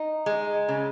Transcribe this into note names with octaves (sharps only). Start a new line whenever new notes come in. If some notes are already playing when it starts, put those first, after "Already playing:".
Already playing: D#4
G#3
C#3